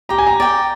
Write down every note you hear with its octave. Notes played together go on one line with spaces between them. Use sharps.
G4 A#5
G#5
A#5
D5 G5